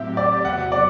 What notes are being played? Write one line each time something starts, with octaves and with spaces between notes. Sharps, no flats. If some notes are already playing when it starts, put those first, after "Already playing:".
Already playing: A2 F#3 C4 G4 E5
D5
E2 C3 F#3 B3 F#5
D5